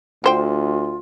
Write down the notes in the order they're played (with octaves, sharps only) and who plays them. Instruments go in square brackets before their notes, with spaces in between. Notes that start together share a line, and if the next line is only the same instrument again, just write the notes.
[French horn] D2 [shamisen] D3 C5 G5 [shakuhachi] F4